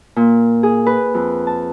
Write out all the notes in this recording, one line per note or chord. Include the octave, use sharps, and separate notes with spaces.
A#2
G#4
B4
F2
A5